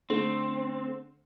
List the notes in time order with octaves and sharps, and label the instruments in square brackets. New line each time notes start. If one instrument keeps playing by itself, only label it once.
[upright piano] D3 A3 [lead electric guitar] C4